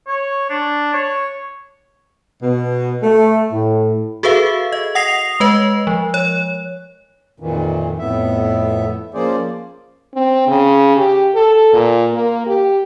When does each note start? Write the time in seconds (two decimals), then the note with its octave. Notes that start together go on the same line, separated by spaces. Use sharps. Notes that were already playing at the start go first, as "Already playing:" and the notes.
0.07 C#5
0.50 D4
0.94 C#5
2.43 B2
3.03 A3
3.52 A2
4.23 F#4 G#4 A4 B4 E5 F5
4.72 D#5
4.95 F#5 D#6 A#6 C7 F7
5.40 G#3 B4 D#5
5.87 F3
6.14 C#5
7.40 F2 A#2 D#3 E3
7.98 F2 A2 B3 E5
9.14 F3 A#3 C#4 G#4 C5 D5
10.14 C4
10.48 C#3
10.97 G4
11.35 A4
11.73 A#2
12.14 A#3
12.47 G4